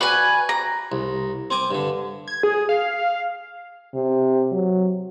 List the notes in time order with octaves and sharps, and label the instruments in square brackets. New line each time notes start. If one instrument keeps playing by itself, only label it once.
[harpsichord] F#4 D5 [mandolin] B4 G#5
[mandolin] A#5
[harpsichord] C2
C4 G#5 D6
G2 D3
[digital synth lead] G#6
G#4
F5
[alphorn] C3
F#3